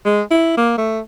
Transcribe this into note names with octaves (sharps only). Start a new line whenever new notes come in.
G#3
E4
A#3
A3